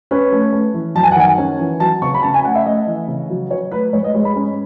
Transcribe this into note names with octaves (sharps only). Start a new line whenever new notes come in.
C#4 B4
A3
A3
E3
F#2 A5
G#5
F#5
D#3 G#5
C#4
E3
F#3 A5
C#3 C#6
B5
C#4 A5
G#5
A3 F#5
E5
A3 D#5
E3
C#3
F#3
F#3 C#5
A3 B4
G#2 C#5
D#5
G#3 C#5
B5
C#4